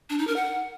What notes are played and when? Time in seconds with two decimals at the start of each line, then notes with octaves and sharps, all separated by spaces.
0.10 D4
0.18 D#4
0.27 A#4
0.36 F#5